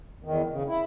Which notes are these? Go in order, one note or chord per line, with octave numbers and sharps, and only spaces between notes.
E2 D#3
C#3
E4